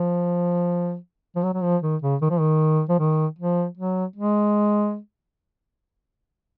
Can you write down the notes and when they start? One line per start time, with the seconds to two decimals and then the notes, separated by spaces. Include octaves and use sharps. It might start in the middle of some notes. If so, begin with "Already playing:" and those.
Already playing: F3
1.36 F3
1.44 F#3
1.54 F#3
1.63 F3
1.82 D#3
2.02 C#3
2.22 D#3
2.30 F3
2.40 D#3
2.89 F3
2.99 D#3
3.39 F3
3.78 F#3
4.16 G#3